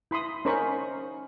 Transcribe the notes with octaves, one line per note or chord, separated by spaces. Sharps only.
E4 B5 C6 D#6
C#4 D#4 A#4 C5 B5 C#6